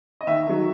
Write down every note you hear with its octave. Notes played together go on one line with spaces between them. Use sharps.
D#5
D#2 E5
D#3 F#3